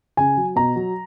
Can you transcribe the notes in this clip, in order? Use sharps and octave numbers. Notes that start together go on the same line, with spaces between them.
C#3 G#5
F#3
B2 A#5
F#3